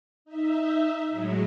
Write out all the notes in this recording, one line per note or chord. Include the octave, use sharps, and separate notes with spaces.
D#4 E5
A2 F#3 G#3